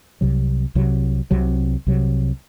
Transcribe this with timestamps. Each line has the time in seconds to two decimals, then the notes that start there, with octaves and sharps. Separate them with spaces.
0.21 C2 C3 F#3
0.75 C2 C3 F#3
1.31 C2 C3 F#3
1.87 C2 C3 F#3